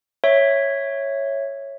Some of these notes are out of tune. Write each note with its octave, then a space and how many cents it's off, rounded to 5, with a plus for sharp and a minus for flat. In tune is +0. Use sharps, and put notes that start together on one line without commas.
C#5 -5 E5 +0